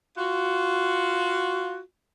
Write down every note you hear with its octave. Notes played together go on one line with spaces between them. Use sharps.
F4 F#4